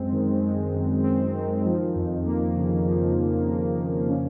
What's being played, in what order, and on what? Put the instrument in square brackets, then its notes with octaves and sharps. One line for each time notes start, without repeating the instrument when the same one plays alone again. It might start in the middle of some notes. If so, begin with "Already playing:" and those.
Already playing: [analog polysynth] F#2 G#3 C4
D#3
G#3
F#2
C4
D#3
F3
F2
A#3
C#3
F3
F2
A#3
C#3
C#4